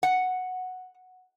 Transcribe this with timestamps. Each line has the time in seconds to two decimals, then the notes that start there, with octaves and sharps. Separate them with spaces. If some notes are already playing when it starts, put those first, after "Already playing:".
0.03 F#5